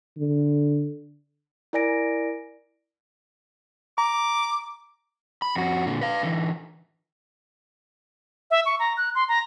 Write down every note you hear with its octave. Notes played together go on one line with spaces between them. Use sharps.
D3
E4 A#4 D5 G#5 A#6 D7
A#5 D6
B5
F2 F#4
A#2 D3
B4 F5
D3 E3
E5
C#6
A#5
F#6
C6
A#5